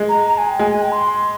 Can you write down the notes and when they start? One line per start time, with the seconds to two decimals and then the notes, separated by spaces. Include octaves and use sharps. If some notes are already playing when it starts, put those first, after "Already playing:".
Already playing: G#3
0.09 A#5
0.26 A#5
0.38 G#5
0.49 G5
0.59 G#3 G#5
0.70 G#5
0.82 G5
0.92 C6